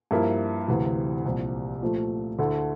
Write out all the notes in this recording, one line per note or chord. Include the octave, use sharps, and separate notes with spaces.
G2 F3 A#3 E4 A#4
D2 C3 E3
C2 A#2 F3
A#2 F3 A3
D2 D3 A3 E4 A4